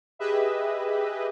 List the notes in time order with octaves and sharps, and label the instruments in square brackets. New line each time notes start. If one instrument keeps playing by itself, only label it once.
[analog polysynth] G4 G#4 B4 D#5 E5